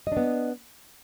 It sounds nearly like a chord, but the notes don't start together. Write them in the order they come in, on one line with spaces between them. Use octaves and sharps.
D#5 D4 B3